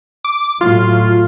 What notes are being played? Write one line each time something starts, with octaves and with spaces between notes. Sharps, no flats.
D6
A2 F#3 F4